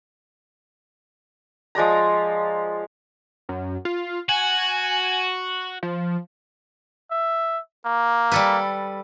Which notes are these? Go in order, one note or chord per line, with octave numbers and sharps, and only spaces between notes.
F3 G#3 D5 A#5
F#2
F4
F#4 G#5
F3
E5
A#3
G3 A4 B4